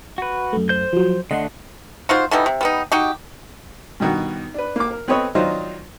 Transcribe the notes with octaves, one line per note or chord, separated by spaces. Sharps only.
F#4 B4
F#2 A3
C5 G6
F3 F#3
D3 A3 D4 D#5 F#5 C6
D#4 F4 F#4 C5
D3 E3 G3 D#4
C3
G3 B3 D#4
D#4 F#4 G4
G2 B2 D#3 B3 F#4
D4 B4
A#3 D6
A#4
B3 C4 A4 B4 C#5 D#5
D#3 F#3 D4 D#4 F4 C5